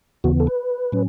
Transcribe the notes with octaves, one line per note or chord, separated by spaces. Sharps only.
D#2 C#3 E3 B3 F#4
A4
B4
A2 F#3 C#4